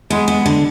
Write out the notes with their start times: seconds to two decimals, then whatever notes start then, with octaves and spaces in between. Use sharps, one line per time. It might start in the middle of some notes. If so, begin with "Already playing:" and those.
0.10 G#3 B3
0.28 B3
0.46 D3